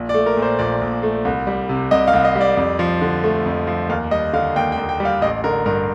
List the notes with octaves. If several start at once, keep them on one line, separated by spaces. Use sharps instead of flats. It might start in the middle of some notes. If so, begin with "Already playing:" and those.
Already playing: A#1
D5
A3
A#4
A#2
C5
A#1 D5
A#1
A3
C2
G3
C3
C2 D#5
F5
C2
D#5
G3
D5
F2
F3
D3
A3
F2
F3
D#2 F5
G3 D#5
D3 F5
D#2 G5
G5
D#2
G5
G3
F5
A1 D#5
D3 A#4
G2 A#4